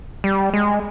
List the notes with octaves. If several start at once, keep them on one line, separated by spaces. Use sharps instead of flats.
G3
G#3